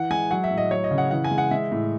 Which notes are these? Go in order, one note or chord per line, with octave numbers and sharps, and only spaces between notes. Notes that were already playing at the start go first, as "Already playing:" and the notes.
Already playing: E3 F#5
G#3 G#5
F#3 F#5
E5
A2
D#5
F#3 C#5
D#5
C#3
F#5
E3 F#5
G#5
G#3
F#5
G#3 E5
A2